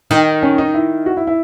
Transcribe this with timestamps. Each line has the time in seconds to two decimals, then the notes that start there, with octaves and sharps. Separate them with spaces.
0.11 D#3 D#4
0.42 C#4
0.58 D#4
0.74 E4
1.06 F#4
1.17 E4
1.27 E4